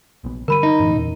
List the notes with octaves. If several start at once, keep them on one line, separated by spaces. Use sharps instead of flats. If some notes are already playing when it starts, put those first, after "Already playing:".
A#1 B3
D3 G3 A#4 B5 D#7
D#4
F#2 A2 E3
E2 A#2